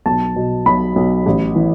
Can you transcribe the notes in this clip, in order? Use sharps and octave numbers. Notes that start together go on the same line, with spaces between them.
B1 A5
B2
B1 B5
B1
A1
E3